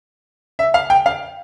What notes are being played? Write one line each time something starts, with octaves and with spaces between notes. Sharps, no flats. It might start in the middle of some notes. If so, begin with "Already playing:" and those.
E5
F5
G5
F5